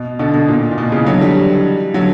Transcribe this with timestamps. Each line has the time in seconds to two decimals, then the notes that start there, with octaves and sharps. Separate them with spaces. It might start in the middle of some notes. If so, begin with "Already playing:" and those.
Already playing: B2
0.19 B2 D3
0.34 B2
0.48 A#2
0.71 A#2
0.78 B2
0.92 C#3 E3
1.06 D3 F#3
1.21 E3 G3
1.94 D3 F#3